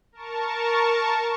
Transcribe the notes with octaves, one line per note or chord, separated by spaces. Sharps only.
A#4 A5 C#6